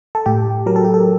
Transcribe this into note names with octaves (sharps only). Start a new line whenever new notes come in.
A4
A2 G4
F#3 A#4
A4
G4
A4